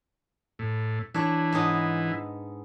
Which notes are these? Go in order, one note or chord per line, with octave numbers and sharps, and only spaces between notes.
A2
E3 D4 C#5
G#2 B3 D#5